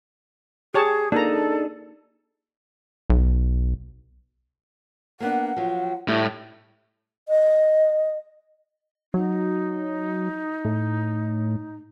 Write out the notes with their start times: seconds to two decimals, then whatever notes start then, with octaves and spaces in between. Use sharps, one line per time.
0.74 G4 G#4 C#5 A5
1.12 A#3 D4 D#4 G#4 A4 A#5
3.10 B1
5.20 A#3 B3 D4 F#5
5.56 F3 F#3
6.08 A2 G3
7.27 D#5
9.14 F#3 D#4
10.65 A2